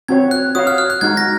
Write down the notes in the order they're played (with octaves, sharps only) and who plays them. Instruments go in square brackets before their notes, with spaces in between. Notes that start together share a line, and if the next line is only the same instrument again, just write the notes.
[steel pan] C4 F#4 C#5 [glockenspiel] G#6
[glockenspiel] F#6
[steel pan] F#4 C#5 F5 [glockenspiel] D#6
[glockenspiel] F6
F6
F#6
[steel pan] G#3 D#4 F#4 [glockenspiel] G#6
[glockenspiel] A#6